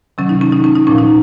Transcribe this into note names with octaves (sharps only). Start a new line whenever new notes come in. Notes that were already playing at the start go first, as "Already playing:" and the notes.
C3 D#3 F#3 C#4
D#4
C#4
D#4
C#4
D#4
A#2 F3 C#4
D#4